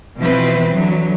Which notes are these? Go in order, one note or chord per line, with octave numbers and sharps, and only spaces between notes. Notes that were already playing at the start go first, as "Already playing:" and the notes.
B2 E3 F3 C4 E4 B4
D3 E3 F#3